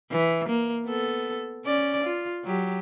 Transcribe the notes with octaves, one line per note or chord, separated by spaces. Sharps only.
E3
A#3
B3 A4
C#4 D5
F4
F#3 G4